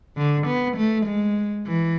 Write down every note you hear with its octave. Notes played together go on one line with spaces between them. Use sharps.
D3
B3
A3
G#3
E3